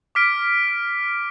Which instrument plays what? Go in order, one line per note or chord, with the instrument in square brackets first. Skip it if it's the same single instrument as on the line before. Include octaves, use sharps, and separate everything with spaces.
[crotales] D6 F6 B6 D7